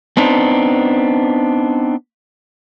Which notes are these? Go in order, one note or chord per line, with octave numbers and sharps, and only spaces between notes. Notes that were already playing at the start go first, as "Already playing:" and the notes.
B3 C4 D4 D#4